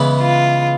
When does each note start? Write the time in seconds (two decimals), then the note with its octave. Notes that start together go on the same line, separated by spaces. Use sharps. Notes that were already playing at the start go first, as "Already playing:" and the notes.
Already playing: C#3 E3 G#3 B3
0.20 F4